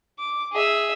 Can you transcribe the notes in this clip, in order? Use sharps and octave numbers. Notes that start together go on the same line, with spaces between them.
D6
G#4 E5